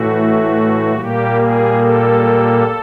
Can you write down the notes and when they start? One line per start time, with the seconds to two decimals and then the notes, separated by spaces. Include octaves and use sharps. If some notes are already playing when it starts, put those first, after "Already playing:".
Already playing: A2 E3 A3 F#4
0.92 A#2 G3 A#3 G4
1.35 G#4
1.78 A4